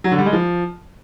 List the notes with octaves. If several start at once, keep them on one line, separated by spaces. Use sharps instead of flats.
F#3
D3
G3
G#3
F3